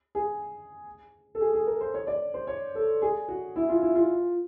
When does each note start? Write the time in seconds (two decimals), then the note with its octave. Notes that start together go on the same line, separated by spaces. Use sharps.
0.15 G#4
1.35 A4
1.41 G#4
1.54 G#4
1.67 A#4
1.81 C5
1.94 C#5
2.07 D5
2.34 C5
2.47 C#5
2.75 A4
3.02 G#4
3.28 F#4
3.56 E4
3.69 F4
3.82 E4
3.95 F4